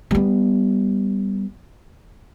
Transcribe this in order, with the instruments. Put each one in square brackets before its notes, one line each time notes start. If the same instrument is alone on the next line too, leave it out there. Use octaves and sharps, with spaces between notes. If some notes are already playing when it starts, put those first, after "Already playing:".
[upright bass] G3 B3